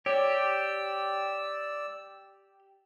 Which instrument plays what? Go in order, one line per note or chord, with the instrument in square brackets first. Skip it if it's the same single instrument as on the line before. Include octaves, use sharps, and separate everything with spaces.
[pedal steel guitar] G4 [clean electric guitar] C#5 [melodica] D5 E6